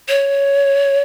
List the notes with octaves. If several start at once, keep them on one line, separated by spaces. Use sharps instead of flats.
C#5